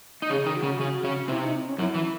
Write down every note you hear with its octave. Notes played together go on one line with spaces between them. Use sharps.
D#4
C#3 C#4 G#4
D#3 D#4
F#4
C#3 C#4
C#3 C#4
C#3 C#4
C3 C4 E4
D#4
C4
C#4
F#2 F#3 E4
E3
E4